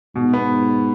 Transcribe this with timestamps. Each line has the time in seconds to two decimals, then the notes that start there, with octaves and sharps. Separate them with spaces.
0.15 G#2 B2
0.33 B3